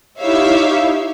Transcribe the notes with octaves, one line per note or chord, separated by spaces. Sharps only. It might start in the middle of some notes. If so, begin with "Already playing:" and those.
D#4 E4 G4 C#5 E5 F5